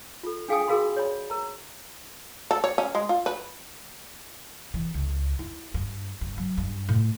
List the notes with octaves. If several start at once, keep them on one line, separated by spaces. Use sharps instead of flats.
F4 A4
D4 G#4 F5 G5 G#5 D#6
F#4 G#4 A#4 F5 B5 C6
C#5 D5 B5
A#4 A#5
A4
C#5
C#4
G#3
F4
B4
E3
C#2
E4
G2
G2
F#3
G2
A2